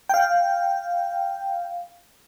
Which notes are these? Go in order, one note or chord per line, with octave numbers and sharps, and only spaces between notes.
F5 G5